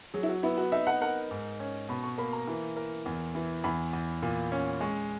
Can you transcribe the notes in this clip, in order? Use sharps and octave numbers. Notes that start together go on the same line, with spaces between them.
F#3 G#4
E4
F#4
B3 E4
F#4
D#4 E5
F#5
A#4 F#5
G#2
C#4
B2 B5
C#6
A#3 B5
A#5
E3
A#4
E2
E3
E2 B5
E2
A#2
C#4
G#3 C#6